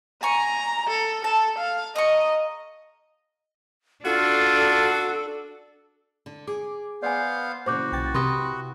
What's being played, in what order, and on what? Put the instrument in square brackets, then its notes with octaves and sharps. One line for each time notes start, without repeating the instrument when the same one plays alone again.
[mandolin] G#5 C#6 [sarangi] A#5
[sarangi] A4
[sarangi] A4 [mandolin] A5
[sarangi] F5
[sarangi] D#5 [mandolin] A#5 C#6
[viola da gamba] D4 [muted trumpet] F4 [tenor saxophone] F#4 [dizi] A4
[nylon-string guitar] D3
[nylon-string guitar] G#4 [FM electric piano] D6
[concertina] B3 C5 F5 [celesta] D5 G#5
[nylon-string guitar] A#2 C#3 E3 [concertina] F#4 [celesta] C5 D6 G6
[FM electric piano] B1 G5 A6
[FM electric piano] C3 [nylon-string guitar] E4 G4 B4 [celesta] C6 D#6 A#6